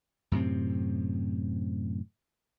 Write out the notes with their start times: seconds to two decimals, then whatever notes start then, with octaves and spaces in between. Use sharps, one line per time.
0.32 F#2 A2 C3 C4